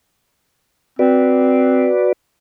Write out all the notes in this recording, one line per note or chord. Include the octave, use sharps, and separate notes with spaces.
C4 F#4 B4 D5